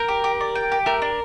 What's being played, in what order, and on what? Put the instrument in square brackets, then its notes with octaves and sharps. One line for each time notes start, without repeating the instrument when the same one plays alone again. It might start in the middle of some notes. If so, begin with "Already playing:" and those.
Already playing: [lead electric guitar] A#4 [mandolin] G5
[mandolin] G4
G4
D5
G5
G4
[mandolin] A3 [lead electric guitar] A#4
[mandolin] D4